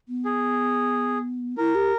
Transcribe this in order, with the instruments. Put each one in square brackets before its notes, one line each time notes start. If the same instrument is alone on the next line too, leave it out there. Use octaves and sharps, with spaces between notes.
[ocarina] B3
[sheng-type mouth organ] G#4
[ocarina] E4 [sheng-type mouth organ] A#4
[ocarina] G4